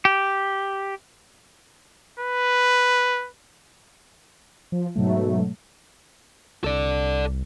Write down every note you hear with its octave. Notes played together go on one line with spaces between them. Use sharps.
G4
B4
F3
G#2 B2 F#3 A3
C2 A4 D5